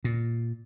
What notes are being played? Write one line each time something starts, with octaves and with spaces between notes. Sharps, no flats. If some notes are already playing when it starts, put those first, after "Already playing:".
A#2